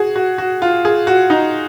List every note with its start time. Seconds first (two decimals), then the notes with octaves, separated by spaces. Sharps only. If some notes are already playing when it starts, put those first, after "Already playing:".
Already playing: F#4 G#4
0.16 F#4
0.38 F#4
0.62 F4
0.85 G#4
1.07 F#4
1.30 D#4